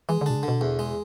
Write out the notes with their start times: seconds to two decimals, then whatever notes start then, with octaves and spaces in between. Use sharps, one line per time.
0.09 E3 G#3
0.21 D3
0.26 B2 D4
0.36 C#3
0.43 D3
0.48 B2
0.61 E2
0.79 G#3